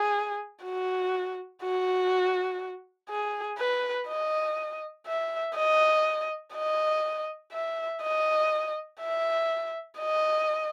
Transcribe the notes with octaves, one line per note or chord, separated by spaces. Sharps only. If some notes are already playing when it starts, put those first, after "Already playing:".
Already playing: G#4
F#4
F#4
G#4
B4
D#5
E5
D#5
D#5
E5
D#5
E5
D#5